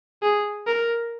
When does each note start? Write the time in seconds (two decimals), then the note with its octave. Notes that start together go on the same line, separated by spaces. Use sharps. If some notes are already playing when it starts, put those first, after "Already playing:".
0.22 G#4
0.67 A#4